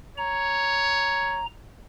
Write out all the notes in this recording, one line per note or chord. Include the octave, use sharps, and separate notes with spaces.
C#5 A#5